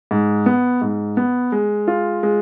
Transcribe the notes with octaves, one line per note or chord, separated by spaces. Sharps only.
G#2
B3
G#2
B3
G#3
F4
G#3